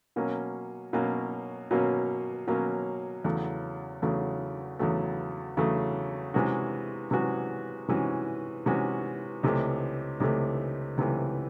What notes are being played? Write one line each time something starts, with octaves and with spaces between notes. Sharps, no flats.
B2 F#3 A#3 C#4
B2 F#3 A#3 C#4
B2 F#3 A#3 C#4
B2 F#3 A#3 C#4
E2 C#3 F#3 A3
E2 C#3 F#3 A3
E2 C#3 F#3 A3
E2 C#3 F#3 A3
C3 E3 G#3 C#4 F#4
C3 E3 G#3 C#4 F#4
C3 E3 G#3 C#4 F#4
C3 E3 G#3 C#4 F#4
C#2 C3 E3 A3
C#2 C3 E3 A3
C#2 C3 E3 A3